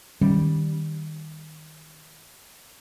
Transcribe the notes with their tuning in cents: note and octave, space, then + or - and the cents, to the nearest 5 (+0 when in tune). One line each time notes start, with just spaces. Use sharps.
D#3 +0 G3 +0 C#4 -5